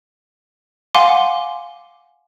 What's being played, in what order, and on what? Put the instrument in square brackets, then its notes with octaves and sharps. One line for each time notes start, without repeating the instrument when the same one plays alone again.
[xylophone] F5 F#5 G#5 C6 D6